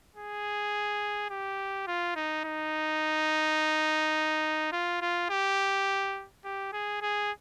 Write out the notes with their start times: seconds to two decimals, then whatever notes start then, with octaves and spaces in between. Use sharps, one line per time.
0.16 G#4
1.30 G4
1.87 F4
2.15 D#4
2.44 D#4
4.72 F4
5.01 F4
5.30 G4
6.44 G4
6.73 G#4
7.02 G#4